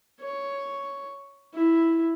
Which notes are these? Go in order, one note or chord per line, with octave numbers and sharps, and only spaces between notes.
C#5
E4